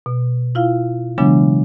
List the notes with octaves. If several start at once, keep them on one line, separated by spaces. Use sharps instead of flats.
B2
E4 F4 F5
C#3 E3 F#3 G#3 B3 D4